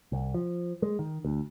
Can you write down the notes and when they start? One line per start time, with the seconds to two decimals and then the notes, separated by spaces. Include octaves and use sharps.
0.12 C2
0.34 F3
0.82 G#3
0.99 D#3
1.25 D2